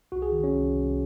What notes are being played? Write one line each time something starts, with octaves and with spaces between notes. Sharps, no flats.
C2 F#4
G#4
D#3
C#4 C#5
C2
C2